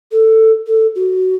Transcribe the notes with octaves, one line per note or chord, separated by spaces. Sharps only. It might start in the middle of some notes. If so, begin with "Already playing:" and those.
A4
A4
F#4